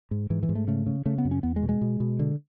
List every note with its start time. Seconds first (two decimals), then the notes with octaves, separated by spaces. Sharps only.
0.11 G#2
0.30 G#2 E3
0.43 E3
0.49 G#2
0.55 A3
0.68 C#3 A3
0.86 C#3
1.06 C#3 A3
1.18 B3
1.25 F#2
1.31 C#4
1.43 E2 B3
1.56 G#3
1.63 B2
1.69 G#3
1.81 B2
2.00 B2
2.19 D3